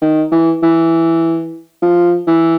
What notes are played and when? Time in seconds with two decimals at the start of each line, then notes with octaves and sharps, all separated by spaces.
0.02 D#3
0.32 E3
0.63 E3
1.82 F3
2.27 E3